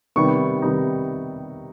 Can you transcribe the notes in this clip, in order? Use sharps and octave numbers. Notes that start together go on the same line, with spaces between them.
C3 D#3 G3 B3 D#4 C#6
C3 D#3 G3 B3 D#4